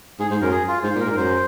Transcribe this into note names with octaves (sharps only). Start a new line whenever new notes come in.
G#2 G#4
G#2 C5
F#2 A#4
G#4
F4
G#2 C5
A#2
A#4
G#2
A#4
F#2 C5